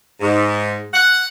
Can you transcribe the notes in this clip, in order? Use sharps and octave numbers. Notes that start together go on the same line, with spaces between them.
G#2
F#5